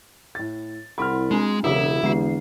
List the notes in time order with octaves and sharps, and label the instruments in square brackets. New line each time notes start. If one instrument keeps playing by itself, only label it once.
[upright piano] A2 A6
[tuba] C2 [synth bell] E4 F#5 C6 [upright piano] B5 F6
[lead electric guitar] G#3 [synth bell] C4 D4
[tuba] E1 [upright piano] C#3 F#3 [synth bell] D4 F#4 G4 [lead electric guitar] E4
[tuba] E2 [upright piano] D3 [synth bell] G#3 D4 C7